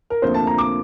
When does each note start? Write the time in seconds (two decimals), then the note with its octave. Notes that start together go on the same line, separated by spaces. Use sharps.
0.10 A#4
0.22 D2 C3 F3 A#3 C5
0.34 A5
0.47 A#5
0.58 D6